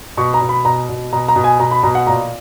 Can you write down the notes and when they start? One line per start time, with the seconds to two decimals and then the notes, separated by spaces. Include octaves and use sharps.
0.17 B2 C#6
0.34 A#5
0.41 B2
0.49 B5
0.65 B2 A#5
0.89 B2
1.13 B2 A#5
1.28 A#5
1.36 B2
1.44 G#5
1.60 B2 A#5
1.71 B5
1.83 B2 A#5
1.95 F#5
2.07 A#2 A#5